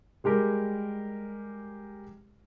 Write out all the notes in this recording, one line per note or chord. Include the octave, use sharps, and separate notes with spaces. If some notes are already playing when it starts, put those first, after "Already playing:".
G3 G#3 G4 A#4